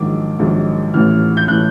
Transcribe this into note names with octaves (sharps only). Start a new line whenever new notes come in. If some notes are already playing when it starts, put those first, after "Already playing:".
Already playing: A#1 G#2 D#3 F#3 D6
A#1 G#2 D#3 F#3
A1 A2 E3 F6
G6
A2 E3 F#6